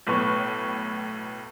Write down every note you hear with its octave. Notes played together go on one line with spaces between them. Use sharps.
B1 A2 B4 C#6